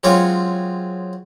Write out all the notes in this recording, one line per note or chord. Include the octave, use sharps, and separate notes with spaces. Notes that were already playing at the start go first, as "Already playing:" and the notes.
F#3 G#3 C4 C#4 F4 C#5